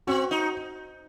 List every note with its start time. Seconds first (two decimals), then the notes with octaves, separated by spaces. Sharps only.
0.07 C4 F#4
0.31 D#4